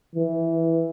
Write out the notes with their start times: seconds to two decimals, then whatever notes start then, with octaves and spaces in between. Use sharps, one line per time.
0.15 E3